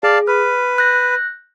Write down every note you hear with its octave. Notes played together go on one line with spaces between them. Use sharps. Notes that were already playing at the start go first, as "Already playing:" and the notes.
G#4 D5 F5 A5
B4 F6
F#6 G6 A#6